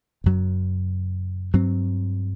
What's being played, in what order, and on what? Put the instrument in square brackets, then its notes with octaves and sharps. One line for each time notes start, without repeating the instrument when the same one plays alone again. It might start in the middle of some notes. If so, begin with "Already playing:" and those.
[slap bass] F#1 F#2 F#3
G2 F#3 C4